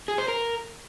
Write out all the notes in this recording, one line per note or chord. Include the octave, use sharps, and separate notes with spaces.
G#4
C5
A#4